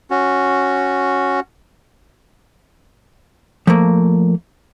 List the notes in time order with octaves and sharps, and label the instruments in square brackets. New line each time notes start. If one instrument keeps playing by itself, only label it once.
[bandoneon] C#4 F#4
[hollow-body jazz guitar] F3 A3 A#3